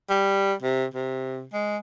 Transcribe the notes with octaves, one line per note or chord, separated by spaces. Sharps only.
G3
C3
C3
G#3